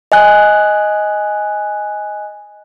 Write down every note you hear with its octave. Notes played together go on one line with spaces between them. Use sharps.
D#5 G#5 F#6